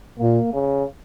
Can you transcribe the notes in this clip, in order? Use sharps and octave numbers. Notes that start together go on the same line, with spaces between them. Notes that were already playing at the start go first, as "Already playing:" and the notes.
A#2 A#3
C#3